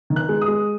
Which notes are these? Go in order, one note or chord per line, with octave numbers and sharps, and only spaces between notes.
D#3
F#6
G#3
D#6
G#3